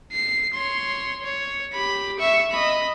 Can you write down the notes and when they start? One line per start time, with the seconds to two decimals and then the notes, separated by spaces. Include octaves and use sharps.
0.12 C7
0.54 C#5 C6
1.24 C#5
1.73 G4 B5
2.19 E5 C#6
2.51 D#5 B5